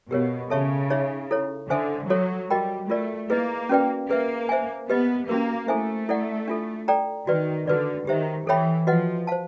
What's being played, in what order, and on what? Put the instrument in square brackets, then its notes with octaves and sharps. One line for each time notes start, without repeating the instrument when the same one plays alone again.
[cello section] B2 [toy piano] G4 A#4 C#5 F5
[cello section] C#3 [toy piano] A4 C#5 E5 A5 C#6
[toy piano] D#4 G#4 C#5 E5
E4 A4 C#5
[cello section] D3 [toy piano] A4 C5 E5 G#5
[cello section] F#3 [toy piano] F#4 A4 C#5
[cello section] G3 [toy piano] F#4 A#4 D#5 G5 B5
[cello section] A3 [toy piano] F4 A#4 D5
[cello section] A#3 [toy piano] E4 G#4 B4 D#5
[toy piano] C#4 F#4 B4 D5 G5
[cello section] A#3 [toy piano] G#4 B4 E5
[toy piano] C5 E5 G#5
[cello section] B3 [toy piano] G4 B4 D#5
[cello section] A#3 [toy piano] C#4 F#4 A#4
[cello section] A3 [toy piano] E4 A4 C5 E5 G#5
[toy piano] E4 A4 D5 F#5
D4 F4 A4
A4 D5 G5 A#5
[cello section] D#3 [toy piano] F#4 B4 D5
[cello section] D3 [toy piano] F#4 B4 D5
[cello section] D#3 [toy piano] G4 C5 E5
[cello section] E3 [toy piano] A4 C#5 E5 G5 B5
[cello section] F3 [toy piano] F#4 B4 D#5 F#5
[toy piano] C5 F5 A5